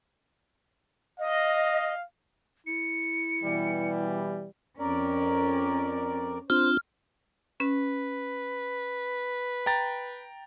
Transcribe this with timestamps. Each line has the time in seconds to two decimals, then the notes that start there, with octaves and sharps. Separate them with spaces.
1.20 D#5 F5
2.67 E4 C#7
3.43 B2 E3 G3
4.79 F2 C#4 A#4 D5
6.50 C4 D4 F4 C5 F6
7.60 C#4 B4
9.66 G5 A#5 A6